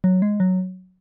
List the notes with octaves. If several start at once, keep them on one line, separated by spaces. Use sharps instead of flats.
F#3
G#3
F#3